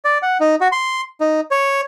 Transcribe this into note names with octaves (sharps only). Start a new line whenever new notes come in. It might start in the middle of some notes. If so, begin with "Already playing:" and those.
D5
F#5
D#4
F#4
C6
D#4
C#5